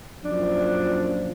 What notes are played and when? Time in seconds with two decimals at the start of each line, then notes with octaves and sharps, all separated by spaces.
0.25 F#2 A#2 F3 D4